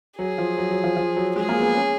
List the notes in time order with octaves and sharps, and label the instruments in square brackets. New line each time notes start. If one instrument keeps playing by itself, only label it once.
[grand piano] F#3 [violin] G#4
[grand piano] F3
F#3
F#3
F3
F3
F#3
[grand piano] G#3 [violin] G#4
[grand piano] A#3
B3
C#4